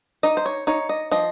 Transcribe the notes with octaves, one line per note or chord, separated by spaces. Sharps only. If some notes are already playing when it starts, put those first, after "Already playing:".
D#4 D#5
C5
C#5
D#4 C#5
D#5
F3 D#5